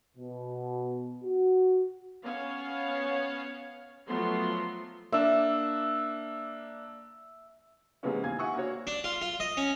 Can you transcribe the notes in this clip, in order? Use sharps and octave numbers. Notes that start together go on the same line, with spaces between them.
B2
F#4
B3 C#4 C#5 F5
F3 F#3 A3 B3 C6
A#3 D4 E5
C3 E3 G#3 A#3 B3 C#4
D#2 F5 G#5 G#6
E5 F#5 G#5 C#6 D#6 E6
A#3 D4 F#4 C#5
D4
F4
F4
D#5
C#4